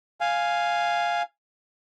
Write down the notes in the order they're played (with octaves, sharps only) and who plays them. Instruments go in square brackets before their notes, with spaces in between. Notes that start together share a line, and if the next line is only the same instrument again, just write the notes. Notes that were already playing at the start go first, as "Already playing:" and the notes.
[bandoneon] F5 G#5